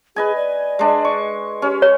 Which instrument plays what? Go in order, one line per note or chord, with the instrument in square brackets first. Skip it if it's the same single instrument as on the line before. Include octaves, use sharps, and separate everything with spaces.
[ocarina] G#4 [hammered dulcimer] B4 D#5 G#5
[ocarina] D5
[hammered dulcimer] G#3 D4
C#6
[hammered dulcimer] C#4 [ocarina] G4
[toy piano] C#5